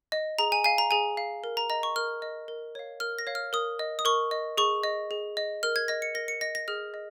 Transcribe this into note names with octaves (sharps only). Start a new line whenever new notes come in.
D#5
G#4 A#5
G#5
F5 G#5
A#5
G#4 G#5
F5
A#4
A#5
D#5 A#5
C#6
A#4 F6
D#5
A#4
C#5 F5
A#4 F6
A#6
C#5 F5
F6
A#4 D#6
D#5
D#6
A#4 C#6
D#5
G#4 C#6
D#5
G#4
D#5
A#4 F6
G#6
D#5 A#6
C#7
A#4 A#6
C#7
D#5 A#6
A#6
G#4 F6
D#5